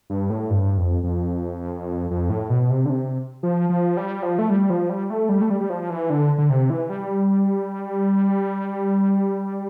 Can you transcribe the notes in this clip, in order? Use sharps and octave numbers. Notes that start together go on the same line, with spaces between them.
G2
A2
G2
F2
F2
F2
A2
B2
C3
D3
C3
F3
F3
G3
F3
A3
G3
F3
G3
A3
G3
A3
G3
G3
F3
E3
D3
D3
C3
E3
G3